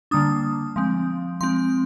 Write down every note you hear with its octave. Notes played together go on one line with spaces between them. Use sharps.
D3 G3 A#3 D4 D#6
F3 G#3 C4
F3 G#3 C4 C6